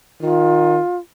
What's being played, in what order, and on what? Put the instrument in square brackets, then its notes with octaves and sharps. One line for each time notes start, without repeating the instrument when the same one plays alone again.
[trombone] D#3 [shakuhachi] F4